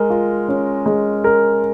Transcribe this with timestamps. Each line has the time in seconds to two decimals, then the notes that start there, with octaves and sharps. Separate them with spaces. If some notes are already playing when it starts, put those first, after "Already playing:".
Already playing: G#3 A#4
0.10 F4
0.49 C#4
0.86 G#3
1.24 A#4